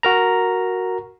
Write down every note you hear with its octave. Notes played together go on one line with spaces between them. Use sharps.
F#4 A#4 A#5